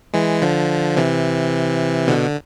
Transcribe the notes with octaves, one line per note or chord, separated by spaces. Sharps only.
E3 G#3
D3 F3
C3 E3
B2 D3